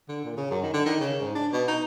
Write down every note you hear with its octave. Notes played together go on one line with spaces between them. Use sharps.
D3
A#2
C#3
F#2
D#3
D3
D#3
C#3
G#2
D4
B2
D#4